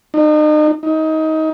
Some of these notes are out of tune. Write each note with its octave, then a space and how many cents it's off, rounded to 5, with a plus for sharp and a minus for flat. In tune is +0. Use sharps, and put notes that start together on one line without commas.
D#4 -40
D#4 +20